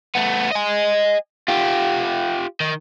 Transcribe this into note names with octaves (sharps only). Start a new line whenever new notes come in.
A3 B3
D#5 G#5
F4 G4
D#3